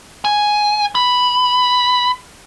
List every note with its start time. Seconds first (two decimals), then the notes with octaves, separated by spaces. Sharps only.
0.25 G#5
0.95 B5